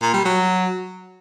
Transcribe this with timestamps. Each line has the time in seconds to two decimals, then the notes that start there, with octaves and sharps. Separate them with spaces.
0.02 A#2
0.14 G3
0.25 F#3